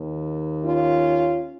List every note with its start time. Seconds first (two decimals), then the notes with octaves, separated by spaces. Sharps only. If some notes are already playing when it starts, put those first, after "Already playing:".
Already playing: D#2 D#3
0.64 C#4 F4